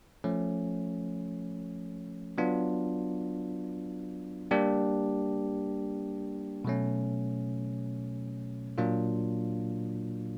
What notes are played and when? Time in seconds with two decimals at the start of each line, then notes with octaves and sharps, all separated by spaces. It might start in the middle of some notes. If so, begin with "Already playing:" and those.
0.24 F3 A3 C#4
2.38 F#3 B3 D4 F4
4.51 G3 A#3 D4 G4
6.64 B2 F#3 A3 C#4
8.78 A#2 F#3 A#3 D4 F4